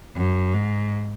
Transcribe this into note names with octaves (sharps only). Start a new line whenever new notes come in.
F#2
G#2